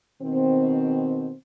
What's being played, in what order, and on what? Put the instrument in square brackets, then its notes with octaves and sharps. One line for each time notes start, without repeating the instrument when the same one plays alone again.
[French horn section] B2 D#3 C4